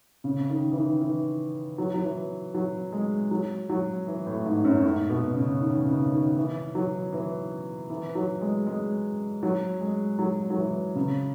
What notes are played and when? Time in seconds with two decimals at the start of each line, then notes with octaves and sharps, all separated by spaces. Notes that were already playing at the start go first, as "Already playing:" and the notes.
0.24 C#3
0.50 D#3
0.72 E3
0.76 D#3
1.01 E3
1.78 F#3
1.94 F#3
2.03 E3
2.55 F#3
2.93 G#3
3.31 F#3
3.70 F#3
4.07 E3
4.26 A2
4.46 G#2
4.65 F#2
4.76 A2
4.84 G#2
5.10 B2
5.35 C#3
5.61 D#3
5.85 C#3
6.11 D#3
6.37 E3
6.75 F#3
7.13 E3
7.90 E3
8.15 F#3
8.41 G#3
8.67 G#3
9.43 F#3
9.81 G#3
10.19 F#3
10.50 F#3
10.58 E3
10.95 C#3